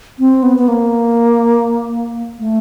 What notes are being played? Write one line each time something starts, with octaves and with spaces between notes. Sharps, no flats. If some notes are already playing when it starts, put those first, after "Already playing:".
C4
B3
B3
A#3
A3